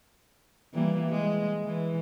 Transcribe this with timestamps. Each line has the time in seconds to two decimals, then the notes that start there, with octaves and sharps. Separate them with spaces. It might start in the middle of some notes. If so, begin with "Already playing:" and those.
0.74 E3 G3 A#3
1.10 G#3
1.65 E3